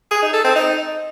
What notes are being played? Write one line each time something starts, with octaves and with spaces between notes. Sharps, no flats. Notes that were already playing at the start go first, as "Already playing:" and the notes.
G#4
D#4
A4
C4
D#4